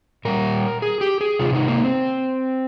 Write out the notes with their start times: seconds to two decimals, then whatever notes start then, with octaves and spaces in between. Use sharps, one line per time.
0.25 A#2 G3 A#4
0.82 G#4
1.01 G4
1.21 G#4
1.39 C3 D#3 G#3 F4
1.54 D#4
1.68 A#3
1.83 C4